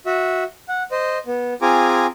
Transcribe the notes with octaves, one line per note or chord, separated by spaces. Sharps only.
F#4 E5
F#5
C5 D#5
B3
C4 F4 G#4 G#5 A#5 D6